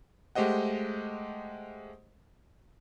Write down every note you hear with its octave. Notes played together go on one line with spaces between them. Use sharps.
G#3 A3 G4 C5 D#5 F#5